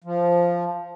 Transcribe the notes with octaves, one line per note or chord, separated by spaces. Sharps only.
F3